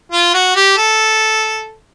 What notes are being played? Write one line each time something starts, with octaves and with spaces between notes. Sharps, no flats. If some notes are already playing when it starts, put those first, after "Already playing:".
F4
F#4
G4
A4